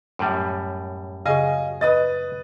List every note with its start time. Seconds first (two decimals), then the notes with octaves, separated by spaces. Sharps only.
0.19 F#2 A2 G3
1.26 C#3 F#4 G#4 D#5 F5 G#5
1.81 B4 D#5 D#6 A6